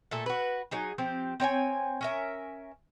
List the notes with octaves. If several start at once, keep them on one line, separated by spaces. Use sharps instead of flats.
A#2 A3 A4
F#4 B4
F#3 D#4 G#4
F3 C4 G4
C4 C#5 G5 G#5
C#4 A#4 E5